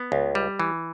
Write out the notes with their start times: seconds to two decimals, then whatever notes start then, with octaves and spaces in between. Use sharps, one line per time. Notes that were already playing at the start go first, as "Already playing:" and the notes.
Already playing: B3
0.12 C#2
0.35 G3
0.60 E3